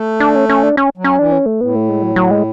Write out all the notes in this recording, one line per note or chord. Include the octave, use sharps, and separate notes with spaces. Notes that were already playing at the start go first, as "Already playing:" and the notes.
Already playing: A3
D4
C#4
C#4
D4
C#4
F#3
C#4
E3 D4
C#4
A3
A2 B3
A3
G#3
F#3
F#3
G#3